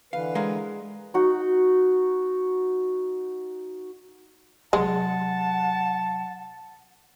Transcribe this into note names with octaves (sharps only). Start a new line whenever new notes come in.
D3 E3 B4 F5
G#3 A#4 F5
D#4 F#4
C3 F#3 G#3 F#5 A5